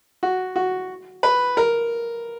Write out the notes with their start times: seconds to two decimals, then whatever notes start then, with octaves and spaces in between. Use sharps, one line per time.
0.23 F#4
0.56 F#4
1.23 B4
1.57 A#4